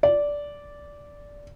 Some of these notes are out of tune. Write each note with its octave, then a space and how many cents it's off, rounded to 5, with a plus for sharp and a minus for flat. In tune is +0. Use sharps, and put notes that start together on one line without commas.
D5 -10